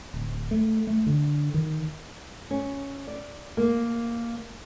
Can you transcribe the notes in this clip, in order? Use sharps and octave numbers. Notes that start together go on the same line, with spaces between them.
D1
A3
A3
D3
D#3
C#4
D5
A#3